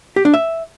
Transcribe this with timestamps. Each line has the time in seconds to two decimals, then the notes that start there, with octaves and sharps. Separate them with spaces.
0.16 G4
0.25 D4
0.34 E5